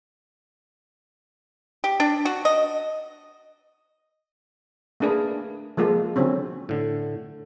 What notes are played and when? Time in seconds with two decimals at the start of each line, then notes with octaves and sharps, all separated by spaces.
1.84 G4
2.00 D4
2.25 F#4
2.45 D#5
5.00 A3 A#3 D4 G#4 A#4 B4
5.77 F3 G#3 A#3 F4 A4
6.16 D3 F#3 C4 C#4
6.69 A2 D3